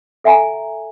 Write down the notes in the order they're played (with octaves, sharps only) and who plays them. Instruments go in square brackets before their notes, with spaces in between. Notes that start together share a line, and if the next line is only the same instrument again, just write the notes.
[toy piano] A4 E5 F#5 G#5 A#5